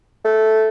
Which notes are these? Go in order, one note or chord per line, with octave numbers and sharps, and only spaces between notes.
A3